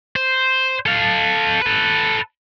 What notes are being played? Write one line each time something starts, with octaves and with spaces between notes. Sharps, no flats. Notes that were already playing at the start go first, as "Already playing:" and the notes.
C5
A4 F5
A4 B4